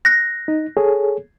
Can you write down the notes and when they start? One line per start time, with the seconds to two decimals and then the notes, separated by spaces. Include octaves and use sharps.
0.05 F#6 A#6
0.48 D#4
0.77 G#4 A4 C#5